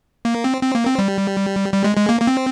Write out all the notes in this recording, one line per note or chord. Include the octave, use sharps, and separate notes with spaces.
A#3
C4
C4
A#3
C4
G3
G3
G#3
G#3
A#3
A#3
C4